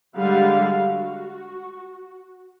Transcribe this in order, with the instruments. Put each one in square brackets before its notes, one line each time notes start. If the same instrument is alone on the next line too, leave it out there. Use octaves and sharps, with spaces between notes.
[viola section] D3 G3 G#3 G4 F5 F#5
F#4